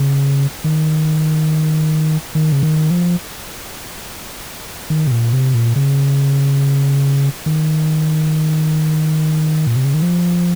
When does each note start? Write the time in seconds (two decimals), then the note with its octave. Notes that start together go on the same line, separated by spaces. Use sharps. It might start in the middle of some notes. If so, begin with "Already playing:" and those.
Already playing: C#3
0.64 D#3
2.35 D#3
2.52 C#3
2.63 D#3
2.91 F3
4.90 D#3
5.07 C3
5.11 A#2
5.33 C3
5.54 A#2
5.76 C#3
7.46 D#3
9.67 A#2
9.76 C3
9.85 C#3
9.94 D#3
10.02 F3